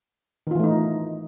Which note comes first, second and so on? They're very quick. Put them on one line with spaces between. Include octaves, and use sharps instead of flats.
D#3 F4 E3 A3 D#4